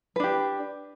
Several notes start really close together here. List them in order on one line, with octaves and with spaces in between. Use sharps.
B4 D4 G4